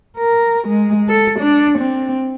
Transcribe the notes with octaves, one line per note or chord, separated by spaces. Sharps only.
A#4
G#3
A4
D4
C4